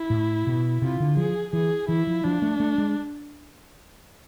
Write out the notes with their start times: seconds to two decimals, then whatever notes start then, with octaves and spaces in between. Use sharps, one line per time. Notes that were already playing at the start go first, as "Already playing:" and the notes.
Already playing: E4
0.10 A2
0.47 B2
0.82 C3 F4
1.00 D3
1.17 F3 G#4
1.53 E3 G#4
1.88 E3 E4
2.07 F3
2.24 F3 D4
2.42 A3
2.60 A3
2.78 G#3